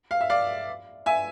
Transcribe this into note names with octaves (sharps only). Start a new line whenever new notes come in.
F5
E5
D5 F5
E5 G#5